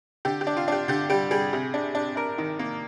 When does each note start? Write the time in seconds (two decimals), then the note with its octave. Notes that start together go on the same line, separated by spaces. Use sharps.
0.25 D3 G4
0.41 G4
0.47 D4
0.57 F4
0.68 D4 G4
0.88 D3 G4
1.10 G3 G4
1.31 G3 G#4
1.53 C3
1.74 D4
1.95 D4
2.16 D4 A#4
2.38 D#3
2.59 A#3